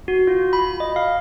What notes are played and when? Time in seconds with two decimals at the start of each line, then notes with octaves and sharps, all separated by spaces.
0.08 F#4
0.27 F4
0.53 B5
0.80 D#5
0.96 F5